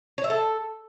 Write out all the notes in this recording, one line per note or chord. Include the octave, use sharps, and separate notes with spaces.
C#5
E5
A4